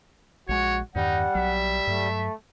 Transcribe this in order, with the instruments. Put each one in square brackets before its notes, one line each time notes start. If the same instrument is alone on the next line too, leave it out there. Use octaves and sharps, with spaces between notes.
[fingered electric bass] A#1 G#3 [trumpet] F#4 [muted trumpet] C#5
[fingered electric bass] E2 G2 D#3 [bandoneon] G3 [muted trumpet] D#4 [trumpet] F#5
[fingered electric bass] B1 F#3 [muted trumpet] E5
[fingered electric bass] G2 F#3 [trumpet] A3